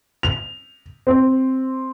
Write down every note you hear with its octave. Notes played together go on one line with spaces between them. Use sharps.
F7
C4